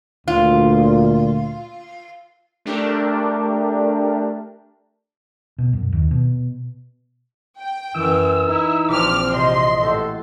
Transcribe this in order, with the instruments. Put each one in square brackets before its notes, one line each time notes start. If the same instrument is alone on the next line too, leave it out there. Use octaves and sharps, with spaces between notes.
[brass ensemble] D2 A#2 [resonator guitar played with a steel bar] F4
[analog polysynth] A3 D4 G4 A#4
[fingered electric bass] B2
F#2
D#2
B2
[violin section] G5
[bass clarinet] F#2 [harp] E3 [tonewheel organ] E6
[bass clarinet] D#4 [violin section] E4
[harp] A#1 B6 [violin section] C4 F6 [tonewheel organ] D6
[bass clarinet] C3 [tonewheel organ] D#5 [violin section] C6
[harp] A2 F#4 G4 [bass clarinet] A4